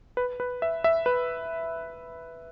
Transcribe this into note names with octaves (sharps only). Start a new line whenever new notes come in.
B4
B4
E5
E5
B4